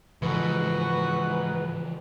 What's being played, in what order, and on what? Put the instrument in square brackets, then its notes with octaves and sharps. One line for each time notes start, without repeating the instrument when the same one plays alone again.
[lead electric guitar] G#2 [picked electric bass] C#3 E3 F3 [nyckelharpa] F#4 A4 [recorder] B4